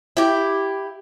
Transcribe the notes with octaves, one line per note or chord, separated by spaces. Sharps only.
E4 G4